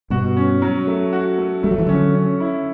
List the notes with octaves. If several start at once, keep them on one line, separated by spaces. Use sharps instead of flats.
G2 B2 F#4
C#4
F#3
A3
F#4
A3
G3 A3
F#3
E3
D3 F#3 C#4
C#4
E4